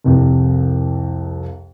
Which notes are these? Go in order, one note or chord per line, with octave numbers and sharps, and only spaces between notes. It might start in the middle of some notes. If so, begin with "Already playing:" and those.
C2 F2 C3